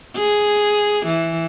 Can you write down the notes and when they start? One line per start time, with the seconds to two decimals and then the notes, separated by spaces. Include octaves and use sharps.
0.17 G#4
1.06 E3